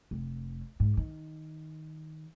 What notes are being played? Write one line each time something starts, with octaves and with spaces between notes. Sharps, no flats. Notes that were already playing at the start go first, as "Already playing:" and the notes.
F1
G#2
D#3